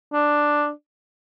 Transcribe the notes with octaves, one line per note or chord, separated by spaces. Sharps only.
D4